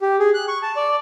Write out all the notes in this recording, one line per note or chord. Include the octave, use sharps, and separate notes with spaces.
G4
G#4
F#6
C#6
A5
D5